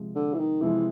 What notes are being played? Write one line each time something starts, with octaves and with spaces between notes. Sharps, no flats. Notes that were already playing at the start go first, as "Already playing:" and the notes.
Already playing: C3 F3 G#3
D3
E3
D#3
C3 E3 F3 G#3